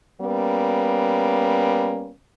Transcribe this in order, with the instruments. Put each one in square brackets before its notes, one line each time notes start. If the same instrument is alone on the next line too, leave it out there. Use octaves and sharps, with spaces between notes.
[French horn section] G3 A#3 B3 C#4